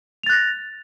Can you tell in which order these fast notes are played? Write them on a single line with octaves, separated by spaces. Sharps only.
F7 A6 F#6 A#6